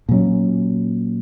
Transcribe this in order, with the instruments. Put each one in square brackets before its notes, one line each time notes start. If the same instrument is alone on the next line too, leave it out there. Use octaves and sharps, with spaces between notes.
[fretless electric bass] A#2 F#3 C#4